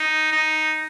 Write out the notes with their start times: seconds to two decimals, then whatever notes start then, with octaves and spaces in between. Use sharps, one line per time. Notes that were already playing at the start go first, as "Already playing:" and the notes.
Already playing: D#4
0.32 D#4